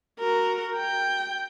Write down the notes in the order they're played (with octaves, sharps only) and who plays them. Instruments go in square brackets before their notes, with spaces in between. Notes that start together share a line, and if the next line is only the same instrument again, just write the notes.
[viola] F#4 A#4
G5